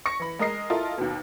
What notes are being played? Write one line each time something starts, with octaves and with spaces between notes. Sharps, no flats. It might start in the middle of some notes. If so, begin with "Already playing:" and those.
C#6 A#6 C#7
E3 B5
G#3 A#4 D#5 C7
E4 F4 A4 A#4 D#5
D#2 B2